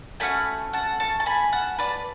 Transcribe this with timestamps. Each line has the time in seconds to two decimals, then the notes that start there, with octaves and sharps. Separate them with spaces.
0.20 A3 C#4 F#4 G#5 B5
0.73 F#5 A5
1.00 A5 C#6
1.20 A5
1.26 G#5 B5
1.53 F#5 A5
1.79 B4 D5